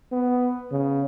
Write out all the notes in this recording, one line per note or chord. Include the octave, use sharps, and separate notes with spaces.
B3
C#3